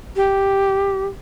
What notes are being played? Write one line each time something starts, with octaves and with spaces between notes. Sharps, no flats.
G4